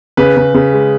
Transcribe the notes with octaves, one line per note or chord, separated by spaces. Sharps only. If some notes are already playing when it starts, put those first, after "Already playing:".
C#3 B4
C#3
C#3
G#3